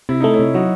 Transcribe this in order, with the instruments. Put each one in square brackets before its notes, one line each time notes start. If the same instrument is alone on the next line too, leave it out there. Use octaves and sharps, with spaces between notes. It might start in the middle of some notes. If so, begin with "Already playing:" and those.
[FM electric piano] C3 [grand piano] E4
[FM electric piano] A3 [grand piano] D#4
[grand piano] C#4 E4
[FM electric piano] C3
[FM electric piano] F#3 [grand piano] D#4 F#4